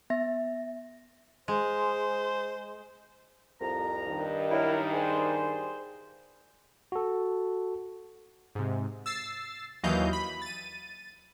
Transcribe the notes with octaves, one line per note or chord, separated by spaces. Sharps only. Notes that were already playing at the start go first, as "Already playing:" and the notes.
B3 E5 A#6
G#3 C5
C2 F2 A#5
G2 D#3
F#3 E4 A#4
G3 G#4 C5
F#4 A4
G#2 C3
E6 A6 C7
D#2 E3 F#3 D#5 F5 G6
B5
A6 D#7